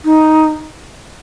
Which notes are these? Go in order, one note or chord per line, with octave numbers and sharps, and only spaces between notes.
D#4